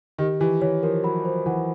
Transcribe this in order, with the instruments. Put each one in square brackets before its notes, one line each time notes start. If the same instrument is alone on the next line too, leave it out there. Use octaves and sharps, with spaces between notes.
[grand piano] D#3 [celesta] G4
[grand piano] E3 [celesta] G4
[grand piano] E3 [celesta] C#5
[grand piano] F3 [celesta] A#4
[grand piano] F#3 [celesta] B5
[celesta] C5
[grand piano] E3 [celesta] F#5